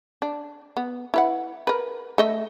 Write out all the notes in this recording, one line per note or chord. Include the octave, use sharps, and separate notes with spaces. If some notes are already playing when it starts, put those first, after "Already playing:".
D4
B3
E4 B4 F#5
A#4 B4
A3 D#5 E5